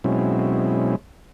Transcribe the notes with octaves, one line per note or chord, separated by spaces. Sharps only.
B2 F#3 G#3 C4 C#4 E4